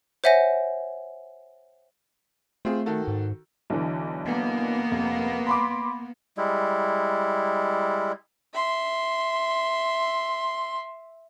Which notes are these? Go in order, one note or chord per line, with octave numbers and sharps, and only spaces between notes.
C5 C#5 E5 F#5 G#5 A#6
A3 C4 F4 G#4
D#3 F#4 A4
G#2
B1 D3 E3
A#3 B3
F1
B5 C6 D6
G3 G#3 E4
E5 C6